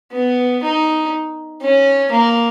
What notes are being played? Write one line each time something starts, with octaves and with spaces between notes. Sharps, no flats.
B3
D#4
C#4
A#3